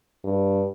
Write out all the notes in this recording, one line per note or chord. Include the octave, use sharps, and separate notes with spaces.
G2